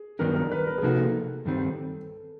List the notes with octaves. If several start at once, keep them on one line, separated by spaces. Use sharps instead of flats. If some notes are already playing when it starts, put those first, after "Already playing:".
Already playing: G#4
G2 D#3 F#3 B3 D4 A#4
A#4
B4
A#4
G#4
C3 F3 A#3 D#4 F#4 A4
G2 D#3 G3 C4